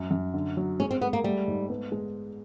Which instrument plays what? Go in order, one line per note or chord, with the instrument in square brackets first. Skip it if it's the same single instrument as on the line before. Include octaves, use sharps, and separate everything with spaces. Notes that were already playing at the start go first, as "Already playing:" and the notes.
Already playing: [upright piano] F#2
F#2
D3
F#3
[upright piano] G#3 [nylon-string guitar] C#4
[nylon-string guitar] C4
[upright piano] G#3 [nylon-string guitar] B3
[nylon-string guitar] A#3
[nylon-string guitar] G3 [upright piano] A3
[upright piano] G#2
B3
G#3